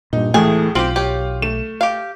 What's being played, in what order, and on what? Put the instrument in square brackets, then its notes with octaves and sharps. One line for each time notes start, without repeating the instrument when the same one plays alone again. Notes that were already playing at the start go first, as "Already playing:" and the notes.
[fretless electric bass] G2 A#2 [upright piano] D#4
[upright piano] C#2 A2 [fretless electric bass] E3 F3 A3 [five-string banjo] G#4
[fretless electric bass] B1 [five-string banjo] C4 G4 [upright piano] F4 F#7
[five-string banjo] G4 C#5
[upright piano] A3 E7
[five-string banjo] G4 F5